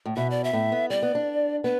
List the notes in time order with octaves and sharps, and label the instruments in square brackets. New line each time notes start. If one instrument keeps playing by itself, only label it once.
[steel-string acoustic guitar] A2
[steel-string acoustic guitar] B2 [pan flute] E5
[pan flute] D5
E5
[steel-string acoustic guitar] A2
B3
[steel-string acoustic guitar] G3 [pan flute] D5
[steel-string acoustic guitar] B3
D4
[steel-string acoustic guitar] B3 [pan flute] B4